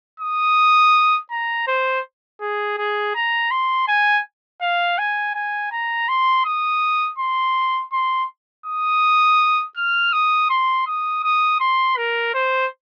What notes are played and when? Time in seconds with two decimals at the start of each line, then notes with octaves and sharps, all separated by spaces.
0.20 D#6
1.31 A#5
1.67 C5
2.41 G#4
2.77 G#4
3.15 A#5
3.51 C6
3.88 G#5
4.61 F5
4.98 G#5
5.35 G#5
5.72 A#5
6.08 C6
6.45 D#6
7.18 C6
7.92 C6
8.66 D#6
9.76 F6
10.13 D#6
10.50 C6
10.86 D#6
11.23 D#6
11.60 C6
11.97 A#4
12.34 C5